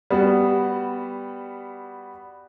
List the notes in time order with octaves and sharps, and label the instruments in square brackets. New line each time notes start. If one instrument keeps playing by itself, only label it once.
[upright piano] G3 B3 F#4